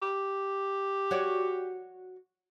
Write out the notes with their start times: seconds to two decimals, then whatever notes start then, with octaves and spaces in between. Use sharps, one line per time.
0.02 G4
1.11 F#4 C#5 D5